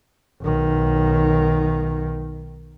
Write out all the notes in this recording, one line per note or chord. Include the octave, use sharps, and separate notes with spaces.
B1 D#3